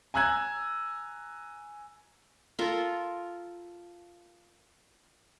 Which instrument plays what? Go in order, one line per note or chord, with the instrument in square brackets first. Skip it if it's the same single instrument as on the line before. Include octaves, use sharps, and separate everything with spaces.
[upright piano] G#5 A#5 E6 F#6 G#6
[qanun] F4 A4 A#4